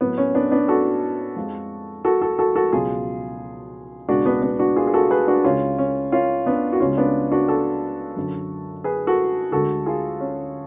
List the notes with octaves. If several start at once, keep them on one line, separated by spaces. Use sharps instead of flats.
A2 F#3 B3
C#4
B3 D4
B3 D4
F#4 A4
F2 F3 G#3
F#4 A4
F#4 A4
F#4 A4
F#4 A4
C#2 B2 F#3 F4 G#4
C#2 B2 G#3 D4 F#4
B3 D4
B3
D4 F#4
F4 G#4
G#4
F#4 A4
G#4 B4
D4 F#4
C#2 C#3 G#3 C#4 F4
C#4
C#4 F4
B3 D4
F#4
C#2 C#3 G#3 C#4 F4
B3 D4
D4 F#4
F#4 A4
F#2 D3 F#3
G#4 B4
F#4 A4
D2 D3 G#3 F#4 A4
F4 G#4
C#4